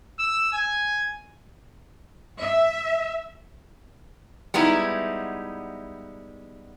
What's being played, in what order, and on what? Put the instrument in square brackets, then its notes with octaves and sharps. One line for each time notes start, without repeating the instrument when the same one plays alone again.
[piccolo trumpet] E6
G#5
[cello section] E5
[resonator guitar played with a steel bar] G3 G#3 B3 D#4 E4